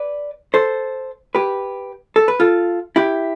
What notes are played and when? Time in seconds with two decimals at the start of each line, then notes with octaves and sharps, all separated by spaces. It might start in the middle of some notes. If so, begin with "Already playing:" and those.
Already playing: B4 D5
0.54 A4 C5
1.35 G4 B4
2.16 A4
2.28 B4
2.40 F4 A4
2.96 E4 G4